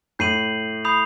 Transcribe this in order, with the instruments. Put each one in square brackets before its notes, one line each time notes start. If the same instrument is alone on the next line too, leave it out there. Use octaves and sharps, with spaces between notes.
[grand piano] A2 [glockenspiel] G6 C7 D#7 F#7
[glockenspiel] B5 D#6 G6 C7 F7